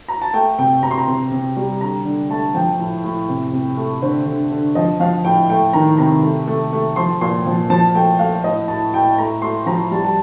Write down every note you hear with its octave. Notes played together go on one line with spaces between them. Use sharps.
A#5
A5
A3 G5
C3 G5
C3 A#5
C6
A#5
C3
C3
G3
D3 A#5
D3
A3 A5
F3 G5
A2
A2
C3
C3
A3
D3 C5
D3
D3
F3 D#5
F3 F5
A2 G5
A3 G5
D#3 A#5
C3 A#5
A3
A3
A3
F3 C6
A#2 C6
F3
F3 A5
A3 G5
A3 F5
A2 D#5
A2 A5
A2 G5
A3 A#5
A3 C6
F3 A#5
G3 A5
A5